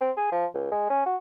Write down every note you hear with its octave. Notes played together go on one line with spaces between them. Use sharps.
C4
G#4
F3
C#2
G#3
C#4
F#4